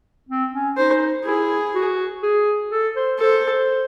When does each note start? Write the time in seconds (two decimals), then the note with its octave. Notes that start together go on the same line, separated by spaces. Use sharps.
0.29 C4
0.53 C#4
0.77 D#4 C5
1.25 E4 G#4
1.75 F#4
2.23 G#4
2.71 A4
2.96 C5
3.20 A4 C5